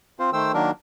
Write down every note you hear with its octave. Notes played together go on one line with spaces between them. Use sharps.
C4 F4 C5
D#3 A3 C5 G5 E6
D#3 F#3 A#3 D4 A#4